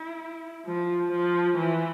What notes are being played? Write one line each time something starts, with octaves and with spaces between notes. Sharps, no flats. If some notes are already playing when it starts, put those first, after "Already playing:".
Already playing: E4
F3
F3
E3